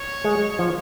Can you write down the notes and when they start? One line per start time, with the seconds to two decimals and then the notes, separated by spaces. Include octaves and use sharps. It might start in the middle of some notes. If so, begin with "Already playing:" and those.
Already playing: C#5
0.24 G#3
0.59 F3